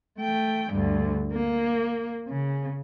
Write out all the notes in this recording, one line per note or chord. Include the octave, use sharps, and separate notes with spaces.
A3 G5
D2 G2
A#3
C#3